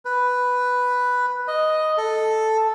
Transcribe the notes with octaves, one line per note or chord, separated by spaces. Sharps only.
B4
D#5
A4